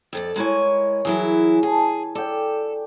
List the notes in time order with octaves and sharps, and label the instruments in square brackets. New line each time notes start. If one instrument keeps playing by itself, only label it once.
[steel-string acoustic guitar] F2 A4 D5
[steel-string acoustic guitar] G#3 E4 G#5 [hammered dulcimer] A#4 C#5
[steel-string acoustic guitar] E3 F#3 E4 [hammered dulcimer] G#4
[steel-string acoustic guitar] G#4 [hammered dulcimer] G#5 A5
[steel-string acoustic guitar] A4 [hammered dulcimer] D5 G5